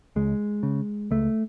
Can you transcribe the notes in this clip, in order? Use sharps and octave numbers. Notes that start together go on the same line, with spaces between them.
C#2 G#3
C#3
C#2 A3